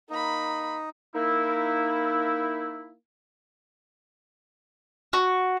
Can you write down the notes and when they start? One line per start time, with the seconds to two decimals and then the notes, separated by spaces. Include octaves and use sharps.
0.10 A#3 D#4 B5
1.14 A#3 D#4 E4
5.13 F#4